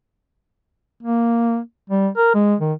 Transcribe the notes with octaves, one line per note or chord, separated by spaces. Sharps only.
A#3
G3
A#4
G#3
D#3